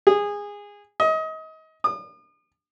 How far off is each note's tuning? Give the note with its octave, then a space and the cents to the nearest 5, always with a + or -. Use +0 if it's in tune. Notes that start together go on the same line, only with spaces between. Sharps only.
G#4 -20
D#5 +30
D#6 -45